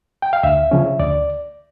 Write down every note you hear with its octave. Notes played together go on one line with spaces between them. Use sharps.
G5
F5
D2 E5
C#3 F3 C#4
D2 D5